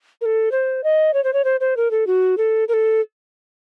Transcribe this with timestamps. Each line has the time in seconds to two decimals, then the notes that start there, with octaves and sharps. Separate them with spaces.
0.21 A#4
0.25 A4
0.52 C5
0.84 D#5
1.14 C#5
1.24 C5
1.33 C#5
1.44 C5
1.60 C5
1.77 A#4
1.91 A4
2.07 F#4
2.38 A4
2.68 A#4
2.73 A4